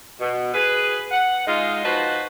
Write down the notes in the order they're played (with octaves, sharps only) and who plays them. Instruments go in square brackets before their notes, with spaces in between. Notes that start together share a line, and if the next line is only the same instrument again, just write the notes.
[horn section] B2
G#4 B4
F#5
G#3 D#4 F4
F3 D#4 F#4 B4 C5 A5